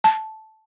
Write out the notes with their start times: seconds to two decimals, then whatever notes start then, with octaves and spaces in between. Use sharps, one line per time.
0.04 A5